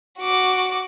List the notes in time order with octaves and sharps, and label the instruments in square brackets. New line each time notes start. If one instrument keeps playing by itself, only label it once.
[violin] F#4 D6